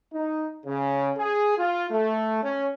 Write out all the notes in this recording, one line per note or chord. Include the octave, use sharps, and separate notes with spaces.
D#4
C#3
G#4
F4
A3
C#4